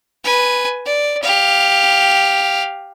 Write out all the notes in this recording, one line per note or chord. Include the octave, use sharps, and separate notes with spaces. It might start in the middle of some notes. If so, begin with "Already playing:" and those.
B4 G#5
D5
G4 F5